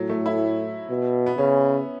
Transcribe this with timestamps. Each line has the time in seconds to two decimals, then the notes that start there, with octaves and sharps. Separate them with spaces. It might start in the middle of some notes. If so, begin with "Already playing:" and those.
Already playing: A2 F#3
0.10 A3
0.26 E4
0.89 B2
1.26 B3
1.38 C#3 C#4